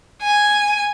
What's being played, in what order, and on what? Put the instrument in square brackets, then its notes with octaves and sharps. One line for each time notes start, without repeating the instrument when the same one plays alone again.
[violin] G#5